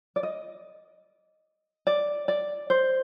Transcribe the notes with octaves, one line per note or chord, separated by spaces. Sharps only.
D5
D#5
D5
D5
C5